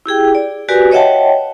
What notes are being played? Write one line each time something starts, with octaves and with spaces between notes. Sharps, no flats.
E4 G4 G#4 G5
D5
F#4 G4 A#4 B4 D5 G#5
C#5 D#5 E5 F#5 G5 A5